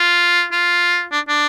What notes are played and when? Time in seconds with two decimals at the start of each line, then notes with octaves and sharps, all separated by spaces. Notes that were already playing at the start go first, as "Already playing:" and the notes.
Already playing: F4
0.52 F4
1.12 D4
1.28 D4